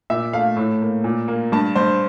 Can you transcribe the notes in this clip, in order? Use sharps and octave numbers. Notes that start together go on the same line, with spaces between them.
A#2 E5
A3 F5
A2
A#3
A#2
A#3
G2 A5
G2 C5